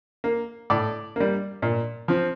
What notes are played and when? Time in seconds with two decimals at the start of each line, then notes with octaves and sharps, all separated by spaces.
0.24 A#3
0.70 A2 D5
1.16 G3 A#3
1.62 A#2
2.08 F3 C4